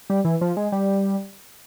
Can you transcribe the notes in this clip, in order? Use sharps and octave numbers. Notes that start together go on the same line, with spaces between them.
G3
E3
F3
G#3
G3